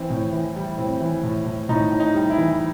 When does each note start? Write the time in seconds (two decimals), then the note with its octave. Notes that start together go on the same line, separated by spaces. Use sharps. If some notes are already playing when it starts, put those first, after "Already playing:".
Already playing: E3 C4
0.10 A2
0.32 E3
0.56 G3
0.78 A2 C4
1.01 E3
1.23 A2
1.46 A2
1.69 A2 D#4
1.92 A2
2.00 D#4
2.14 G3
2.30 E4
2.38 E3